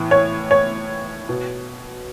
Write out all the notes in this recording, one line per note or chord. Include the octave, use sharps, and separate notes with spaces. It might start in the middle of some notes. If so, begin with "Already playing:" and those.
Already playing: A2 E3
C#5
C#5
B2